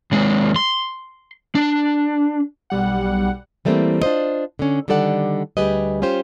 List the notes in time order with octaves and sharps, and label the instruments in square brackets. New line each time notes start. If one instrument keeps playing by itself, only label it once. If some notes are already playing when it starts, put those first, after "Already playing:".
[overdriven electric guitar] D#2 G#3
C6
D4
[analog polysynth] B1 G3 F#5
[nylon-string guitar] E3 G3 A3 A#3 C4
D4 F4 C5 D#5
D3 C#4
D3 D#3 G3 A4 D5 F#5
D2 G3 G4 G#4 B4 D#5
C#4 F4 G4 C5